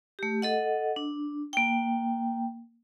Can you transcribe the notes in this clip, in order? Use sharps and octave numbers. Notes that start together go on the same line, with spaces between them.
A3 G4
A4 D#5 F#5
D4
A#3 G5